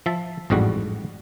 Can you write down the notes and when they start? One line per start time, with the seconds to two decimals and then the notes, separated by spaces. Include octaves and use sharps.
0.06 F3 E5 A5
0.50 A1 F2 G#2 G3 F#4